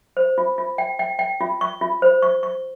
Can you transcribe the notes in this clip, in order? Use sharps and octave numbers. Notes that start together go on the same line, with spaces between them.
C5
F4
F4
G5
G5
G5
F4
C#6
F4
C5
C#6
C#6